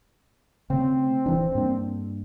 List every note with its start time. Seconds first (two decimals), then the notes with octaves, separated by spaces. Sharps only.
0.70 C#3 A3 C4
1.26 D1 E3 D4
1.55 G2 A#3 D4